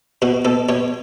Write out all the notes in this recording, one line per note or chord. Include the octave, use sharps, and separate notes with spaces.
B2 F#4
B2 A4
B2 C#5